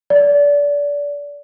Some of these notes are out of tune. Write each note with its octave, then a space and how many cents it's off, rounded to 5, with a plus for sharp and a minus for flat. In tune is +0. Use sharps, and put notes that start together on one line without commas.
D5 -25